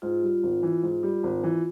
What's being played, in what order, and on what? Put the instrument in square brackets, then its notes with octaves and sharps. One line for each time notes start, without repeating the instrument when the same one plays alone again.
[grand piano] G#2 [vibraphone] F4
[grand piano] G3
G#1
E3
G#2
G3
G#1
E3